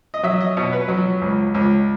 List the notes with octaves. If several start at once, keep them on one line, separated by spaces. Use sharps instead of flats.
D#5
F#3 E5
D#5
B2 C#5
B4
F#3
C#2
C#2